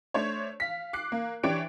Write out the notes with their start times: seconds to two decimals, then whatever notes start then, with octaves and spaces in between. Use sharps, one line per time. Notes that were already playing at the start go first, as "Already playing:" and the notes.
0.14 A3 D4 C5 C#5
0.60 F5 B6
0.93 D6 F#6 C7
1.12 A#3
1.43 E3 D4 G4 C#5 D7